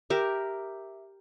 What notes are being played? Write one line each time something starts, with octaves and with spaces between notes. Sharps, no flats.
G4 A#4 E5